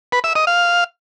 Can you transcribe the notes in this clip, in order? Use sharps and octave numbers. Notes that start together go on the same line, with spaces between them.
B4
E5
D#5
F5